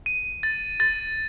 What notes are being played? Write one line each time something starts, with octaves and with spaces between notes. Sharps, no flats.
D#7
A6
A6